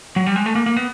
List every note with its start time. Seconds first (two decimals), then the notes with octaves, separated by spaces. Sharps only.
0.16 F#3
0.26 G3
0.36 G#3
0.46 A3
0.55 A#3
0.66 A#3
0.77 B3